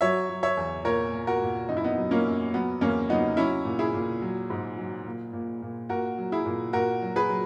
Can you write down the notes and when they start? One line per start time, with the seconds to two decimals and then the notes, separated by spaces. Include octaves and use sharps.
0.01 F#3 C#5 E5
0.29 F#3
0.43 C#5 E5
0.57 E2
0.85 A#2 A#4 C#5
1.13 A#2
1.27 F#4 A#4
1.42 A#2
1.69 F#2 D#4
1.77 E4
1.84 B3 D#4
1.98 F#3
2.11 A#3 C#4
2.26 F#2
2.54 F#3 B3
2.81 E2 A#3 C#4
3.09 F#3 B3 D#4
3.37 F#3 C#4 E4
3.65 A#2
3.79 E4 G#4
3.94 A#2
4.22 F#3
4.50 G#2
4.78 F#3
5.06 A#2
5.33 A#2
5.62 A#2
5.89 A#2 F#4 A#4
6.18 F#3
6.32 E4 G#4
6.46 A#2
6.73 A#2 F#4 A#4
7.02 F#3
7.16 G#4 B4
7.29 F#3